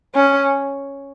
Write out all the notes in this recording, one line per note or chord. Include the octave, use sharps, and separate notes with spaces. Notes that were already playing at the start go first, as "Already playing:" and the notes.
C#4